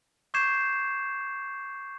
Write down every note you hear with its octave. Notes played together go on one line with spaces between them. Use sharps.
C#6 D6 G6 G#6 C7 E7